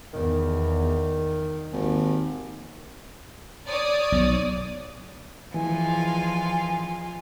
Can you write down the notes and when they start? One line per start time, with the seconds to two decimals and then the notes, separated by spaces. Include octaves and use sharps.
0.14 E2 D#3
1.72 G#1 D#2
3.68 C#5 D5 D#6
4.12 B1
5.54 E3 F3 G#3 F4 G#5